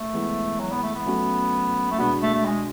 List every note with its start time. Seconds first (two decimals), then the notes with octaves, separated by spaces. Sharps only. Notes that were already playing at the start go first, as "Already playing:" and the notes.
Already playing: A3
0.14 E3 G#3 B3 E4
0.60 F#3
0.71 B3
0.83 A3
0.95 B3
1.06 F#3 A3 C#4 F#4
1.91 A3
1.99 B2 G#3 B3 D4 F#4
2.22 A3
2.34 A3
2.45 G#3